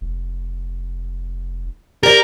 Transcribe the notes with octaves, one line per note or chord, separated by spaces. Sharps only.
F1
G4 A#4 D5